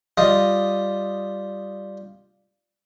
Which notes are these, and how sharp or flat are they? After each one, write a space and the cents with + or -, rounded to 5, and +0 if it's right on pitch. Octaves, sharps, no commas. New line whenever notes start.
G3 +0 F4 -5 D#5 +0